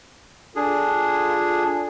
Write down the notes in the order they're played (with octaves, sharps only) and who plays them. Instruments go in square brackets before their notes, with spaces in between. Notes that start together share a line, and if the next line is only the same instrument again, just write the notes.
[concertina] D4 G#4 [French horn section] F4 A4